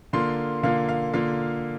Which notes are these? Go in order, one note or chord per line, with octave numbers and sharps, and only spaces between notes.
D3 A#3 F4 C6
D3 A#3 F4 F5
F5
D3 A#3 F4 F5